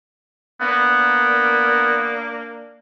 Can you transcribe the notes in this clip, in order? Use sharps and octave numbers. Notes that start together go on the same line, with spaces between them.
A#3 B3 D4